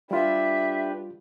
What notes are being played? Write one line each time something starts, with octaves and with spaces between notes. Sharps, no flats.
G3 D4 F4 G4 B4 E5